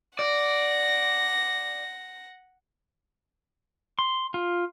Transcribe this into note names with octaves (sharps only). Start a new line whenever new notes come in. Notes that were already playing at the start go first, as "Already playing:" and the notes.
D5 F#5 A#6
C6
F4